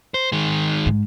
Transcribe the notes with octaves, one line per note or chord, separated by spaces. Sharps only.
C5
D#3 G#3
G#2